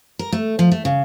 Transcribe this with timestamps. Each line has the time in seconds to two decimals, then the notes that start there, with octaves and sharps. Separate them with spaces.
0.19 A#4
0.32 A3
0.59 F3
0.72 A3
0.85 C#3